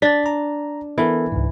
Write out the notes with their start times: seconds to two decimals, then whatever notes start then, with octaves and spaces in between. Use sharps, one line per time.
0.02 D4 A6 B6
0.26 A#5
0.98 E3 B3 A4 A#4
1.32 C#2 G#2